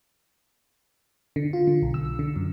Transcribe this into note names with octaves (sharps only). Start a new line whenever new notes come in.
D3
F4
D3
B1
E6
D3
F#2